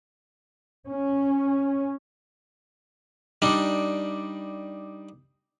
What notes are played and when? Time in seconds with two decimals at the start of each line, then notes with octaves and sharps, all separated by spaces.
0.86 C#4
3.42 G3 D4 D#4